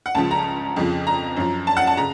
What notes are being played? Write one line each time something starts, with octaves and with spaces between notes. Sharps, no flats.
F#5
C#2 C#3 F3 A5
A#5
F2 C#3 F3
A#5
F#2 F3
A5
F#5
A5
C#3 A#5